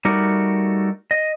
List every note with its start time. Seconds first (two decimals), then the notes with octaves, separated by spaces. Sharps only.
0.05 G3 A3 D#4 F#4 G4 A#4
1.11 D#5